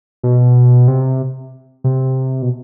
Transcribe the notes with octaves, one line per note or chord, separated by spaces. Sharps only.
B2
C3
C3
B2